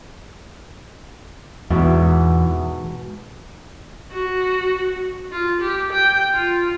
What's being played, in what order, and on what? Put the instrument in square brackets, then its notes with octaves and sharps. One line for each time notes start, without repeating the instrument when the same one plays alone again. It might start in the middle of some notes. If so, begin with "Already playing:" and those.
[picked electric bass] E2 [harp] G#2 B2
[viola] F#4
F4
G4
G5
F4